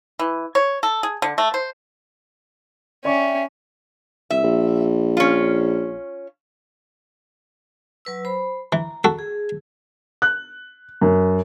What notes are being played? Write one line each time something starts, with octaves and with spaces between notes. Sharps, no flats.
E3
C#5
A4
G#4
D3
A3
C5
C#4 D5 E5 G5 C#6
C2 E5
A#1
C#4 F4
F#3 B4 E6
C5 B5
E3 A#5
F#4 A4
G#4
F#6
F#2